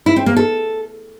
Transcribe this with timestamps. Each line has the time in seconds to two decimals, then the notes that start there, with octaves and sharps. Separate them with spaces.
0.06 E4
0.16 C4
0.26 A#3
0.36 A4